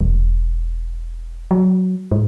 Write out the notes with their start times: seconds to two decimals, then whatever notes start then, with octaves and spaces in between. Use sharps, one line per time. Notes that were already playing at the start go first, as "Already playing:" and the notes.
0.01 E1
1.51 F#3
2.11 G#2